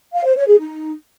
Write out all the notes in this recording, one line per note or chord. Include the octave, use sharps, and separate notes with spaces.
F5
C5
C#5
G#4
D#4